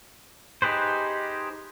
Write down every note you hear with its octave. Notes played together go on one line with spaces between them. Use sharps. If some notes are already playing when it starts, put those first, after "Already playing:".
D#4 G4 G#4 B4 C5